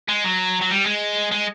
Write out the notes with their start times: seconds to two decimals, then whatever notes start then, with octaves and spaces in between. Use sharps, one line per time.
0.09 G#3
0.24 F#3
0.61 F#3
0.71 G3
0.86 G#3
1.32 G#3